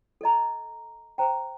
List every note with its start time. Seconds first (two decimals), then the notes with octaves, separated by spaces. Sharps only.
0.21 A4 D#5 A#5
1.18 C5 G5 A#5